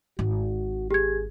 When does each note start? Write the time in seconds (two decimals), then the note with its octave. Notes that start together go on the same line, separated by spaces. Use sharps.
0.19 G#1 F#4
0.91 G4 G#4 G#6